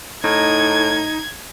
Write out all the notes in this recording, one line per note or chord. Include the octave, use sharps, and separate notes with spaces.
A2 D#4 G#6